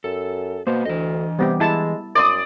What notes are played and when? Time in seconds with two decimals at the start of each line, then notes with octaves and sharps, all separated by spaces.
0.04 F#2 A4
0.67 B2 A#3 B3 C5
0.85 D2 E3 D#5
1.39 C3 G3 B3 G4
1.60 G#3 E4 A5
2.15 F#2 D5 C6 D#6